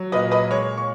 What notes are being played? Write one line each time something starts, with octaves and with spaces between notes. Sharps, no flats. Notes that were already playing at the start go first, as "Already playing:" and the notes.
Already playing: F#3
A#2 B4 D#5
B4 D#5
G#3 C#5
C#6